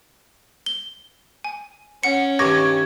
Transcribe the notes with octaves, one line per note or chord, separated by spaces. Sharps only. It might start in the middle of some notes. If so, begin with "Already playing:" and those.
G7
G#5
C#4 F#5 C#7
G2 D#3 C#6 D6 G#6 A#6